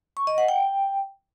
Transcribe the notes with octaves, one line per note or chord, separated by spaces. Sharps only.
C#6
D#5
F#5
G5